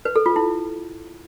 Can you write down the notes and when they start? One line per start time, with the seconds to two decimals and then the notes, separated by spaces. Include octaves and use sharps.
0.05 B4
0.16 A4
0.26 F4
0.36 E4